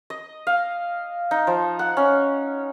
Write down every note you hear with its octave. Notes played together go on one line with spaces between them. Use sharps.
D#5
F5
D#4
F3
F#5
C#4